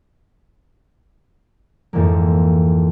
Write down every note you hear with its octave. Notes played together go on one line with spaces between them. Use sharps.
F2 G#2 E3 F3 G#3 A#3